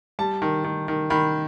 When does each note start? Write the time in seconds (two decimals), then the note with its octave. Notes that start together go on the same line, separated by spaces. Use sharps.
0.19 G3 A5
0.42 D#3
0.64 D#3
0.88 D#3
1.10 D#3 B5